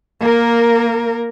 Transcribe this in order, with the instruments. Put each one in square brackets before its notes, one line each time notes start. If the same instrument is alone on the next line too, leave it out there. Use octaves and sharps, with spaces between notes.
[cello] A#3 A#4